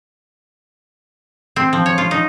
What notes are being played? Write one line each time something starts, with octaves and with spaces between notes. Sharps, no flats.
C4
F3
C#5
F4
D#4